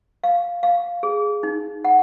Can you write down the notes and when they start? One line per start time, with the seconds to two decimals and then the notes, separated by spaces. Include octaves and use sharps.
0.24 F5
0.63 F5
1.03 G#4
1.43 D#4
1.85 F#5